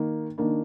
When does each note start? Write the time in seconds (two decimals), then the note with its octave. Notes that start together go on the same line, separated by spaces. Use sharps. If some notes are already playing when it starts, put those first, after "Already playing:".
Already playing: D#3 A#3
0.38 D#3 A#3 D4